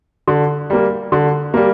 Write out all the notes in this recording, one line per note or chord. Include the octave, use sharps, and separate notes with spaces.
D3
G3 A#3
D3
G3 A#3